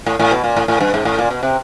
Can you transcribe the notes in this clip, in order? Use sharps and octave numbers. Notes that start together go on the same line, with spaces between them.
A2
A2
B2
A#2
A2
A2
G2
G#2
A2
A#2
B2
C3